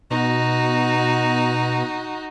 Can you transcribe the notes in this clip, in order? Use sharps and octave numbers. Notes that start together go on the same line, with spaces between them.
B2 D#4 F#4